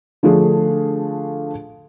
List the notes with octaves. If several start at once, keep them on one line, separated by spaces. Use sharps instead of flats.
D3 F3 A3 D4 G#4